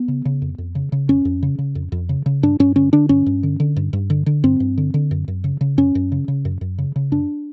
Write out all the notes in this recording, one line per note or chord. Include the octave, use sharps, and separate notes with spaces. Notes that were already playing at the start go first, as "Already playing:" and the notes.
Already playing: B3
C#3
C#3
F2
F2
C#3
C#3
F2 C#4
F2
C#3
C#3
F2
F2
C#3
C#3
G2 D4
G2 C#4
D3 C#4
D3 D4
G2 C#4
G2
D3
D3
G2
G2
D3
D3
G2 C4
G2
D3
D3
F#2
F#2
C#3
C#3
F#2 C#4
F#2
C#3
C#3
F#2
F#2
C#3
C#3
F#2 D4